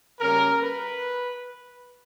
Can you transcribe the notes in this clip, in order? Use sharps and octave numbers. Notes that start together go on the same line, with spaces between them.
C#3 G3 A#3 C#4 A#4
B4